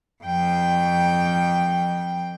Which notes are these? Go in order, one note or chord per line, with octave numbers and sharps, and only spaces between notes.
F2 G5